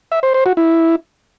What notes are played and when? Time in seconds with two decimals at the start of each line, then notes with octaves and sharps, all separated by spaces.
0.12 E5
0.23 C5
0.34 C5
0.46 F#4
0.57 E4